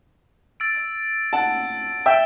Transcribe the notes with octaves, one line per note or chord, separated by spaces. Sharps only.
E6 A6 D7
F#5 A5 E6 A6 D7
E5 G5 A6 E7 G7